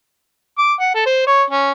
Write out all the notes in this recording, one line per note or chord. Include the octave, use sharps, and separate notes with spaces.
D6
F#5
A4
C5
C#5
C#4